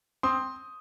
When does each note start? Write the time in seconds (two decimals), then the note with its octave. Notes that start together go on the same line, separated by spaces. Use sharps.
0.23 C4 C6 D#6